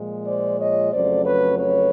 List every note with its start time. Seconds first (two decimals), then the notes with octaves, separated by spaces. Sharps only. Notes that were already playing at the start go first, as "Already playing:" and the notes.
Already playing: A#2 F3 G#3
0.25 C5 D5
0.58 C#5 D#5
0.91 F2 C#3 F#3 A3 C5 D5
1.24 B4 C#5
1.57 B4 C#5